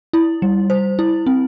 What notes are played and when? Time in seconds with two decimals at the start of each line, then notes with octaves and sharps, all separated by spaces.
0.13 E4
0.42 G3
0.70 C5
0.99 E4
1.26 C4